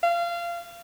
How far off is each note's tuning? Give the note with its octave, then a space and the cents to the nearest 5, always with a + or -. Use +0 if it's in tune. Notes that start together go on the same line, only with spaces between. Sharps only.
F5 -25